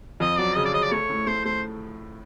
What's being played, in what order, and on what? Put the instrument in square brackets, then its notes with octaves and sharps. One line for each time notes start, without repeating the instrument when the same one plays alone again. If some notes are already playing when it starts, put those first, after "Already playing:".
[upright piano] F2 [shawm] D#5
[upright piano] F#3 [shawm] D5
[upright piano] C#3 [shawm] D#5
[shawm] D5
[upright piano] C#3 [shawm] D#5
[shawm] D5
[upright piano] A3 [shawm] C#5
[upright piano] A2
[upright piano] A3 [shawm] C5
[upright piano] A3 [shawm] C5